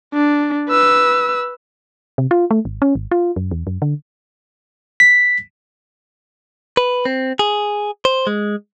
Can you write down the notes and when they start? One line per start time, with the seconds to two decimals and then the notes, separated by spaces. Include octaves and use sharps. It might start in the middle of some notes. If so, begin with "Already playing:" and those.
0.14 D4
0.69 B4 E6
2.18 C3
2.31 F4
2.51 A3
2.65 G#1
2.82 C#4
2.95 G#1
3.11 F4
3.36 F#2
3.51 E2
3.67 F#2
3.82 D3
5.00 B6
6.77 B4
7.05 C4
7.39 G#4
8.05 C5
8.27 G#3